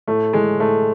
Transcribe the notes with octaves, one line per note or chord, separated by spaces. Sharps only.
A2 A3
E3 G#3
A2 A3